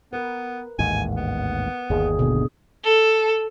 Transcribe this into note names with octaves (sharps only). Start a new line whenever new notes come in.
B3 A#4 B4
A1 D#2 G#2 G#5
B3
G1 D#2 G#4
B2 D3
A4